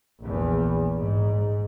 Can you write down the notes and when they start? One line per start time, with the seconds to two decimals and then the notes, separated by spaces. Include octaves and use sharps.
0.21 A#1 E2
0.97 G#2